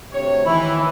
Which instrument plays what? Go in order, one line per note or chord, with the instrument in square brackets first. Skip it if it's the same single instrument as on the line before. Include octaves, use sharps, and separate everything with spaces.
[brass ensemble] D2 C3 C#5
[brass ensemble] D#3 E3 [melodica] E4